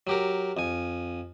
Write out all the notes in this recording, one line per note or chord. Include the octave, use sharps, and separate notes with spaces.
F#3 G4 A#4
F2 G#5